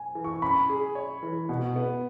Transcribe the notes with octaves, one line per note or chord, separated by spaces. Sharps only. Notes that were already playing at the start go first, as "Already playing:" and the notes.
Already playing: G#5
E3
C#6
C#4 B5
G#4
C#5
E3
B2 F#5
B3